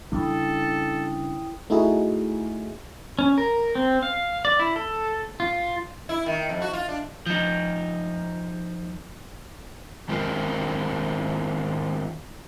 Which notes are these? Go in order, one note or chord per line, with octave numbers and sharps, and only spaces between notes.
C#3 G3 D4 E4 A4 G5 D#6
A3 D#4 E4 F#4 G#4
C#4
A#4
C4
F5
D5
E4
A4
F4
E4
D#3
F2
F#4
F4
D4
F3 D#4
D#3 G#3 C4 F4 A#4